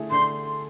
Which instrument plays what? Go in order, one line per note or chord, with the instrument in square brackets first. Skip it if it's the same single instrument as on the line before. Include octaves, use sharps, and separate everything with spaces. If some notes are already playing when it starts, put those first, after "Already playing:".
Already playing: [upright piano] D3 A3 E4 G#4
[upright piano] D3 [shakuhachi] C6